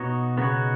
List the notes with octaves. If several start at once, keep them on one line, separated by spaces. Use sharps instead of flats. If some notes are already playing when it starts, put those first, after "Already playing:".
Already playing: B2 B3 D#4 F#4 C#5
C#3 B3 D#4 F#4 C#5